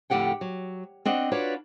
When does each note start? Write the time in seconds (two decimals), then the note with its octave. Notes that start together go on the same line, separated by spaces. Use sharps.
0.10 F2 A2 D3 G4 F#5 G5
0.41 F#3
1.05 C4 D4 D#5 F#5
1.31 D4 F4 F#4 B4 C#5 D5